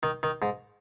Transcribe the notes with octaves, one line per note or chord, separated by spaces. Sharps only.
D#3
D#3
G#2